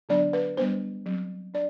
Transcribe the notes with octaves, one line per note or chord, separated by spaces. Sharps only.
D3 F#3 B3 D4 D5
B4
G3 B3 D4 C5
F#3 C4
D4 D5